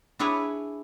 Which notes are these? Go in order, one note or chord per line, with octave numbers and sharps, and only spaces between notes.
D4 E4 G#4 B4 C#5